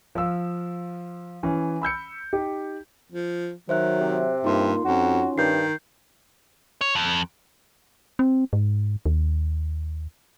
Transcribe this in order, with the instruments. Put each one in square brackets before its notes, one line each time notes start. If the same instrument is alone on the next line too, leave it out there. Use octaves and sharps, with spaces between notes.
[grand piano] F3 F5 E6
E3 C#4
B5 E6 G6 C#7
D#4 G4
[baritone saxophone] F3
[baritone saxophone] D#3 [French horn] F#3 [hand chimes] C5 E5 F#6
[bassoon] C3
[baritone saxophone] G2 [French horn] A#3 [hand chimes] D#4 F4 C6
[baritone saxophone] F2 [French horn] C#4 [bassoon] F#4
[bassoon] G2 [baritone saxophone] D#3 [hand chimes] G6 C7
[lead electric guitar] C#5
F2
[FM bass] C4
G#2
D#2